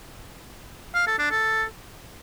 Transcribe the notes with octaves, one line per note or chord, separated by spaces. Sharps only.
F5
A4
D4
A4